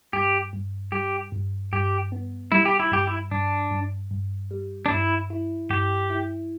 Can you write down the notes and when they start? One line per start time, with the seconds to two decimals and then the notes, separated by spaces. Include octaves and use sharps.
0.13 G2 G4
0.53 G2
0.92 G3 G4
1.32 G2
1.73 G2 G4
2.12 B3
2.52 G3 E4
2.65 G4
2.80 E4
2.92 G2 G4
3.07 E4
3.31 G2 D4
3.71 G2
4.11 G2
4.51 G3
4.86 D4
4.90 G2 E4
5.30 E4
5.70 G2 G4
6.10 E4